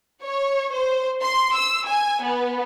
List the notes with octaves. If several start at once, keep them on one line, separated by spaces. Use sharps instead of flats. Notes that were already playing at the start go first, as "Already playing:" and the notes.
C#5
C5
C6
E6
G#5
B3